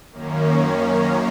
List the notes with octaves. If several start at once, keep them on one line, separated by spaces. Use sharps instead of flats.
F#2 D#3 A#3 C#4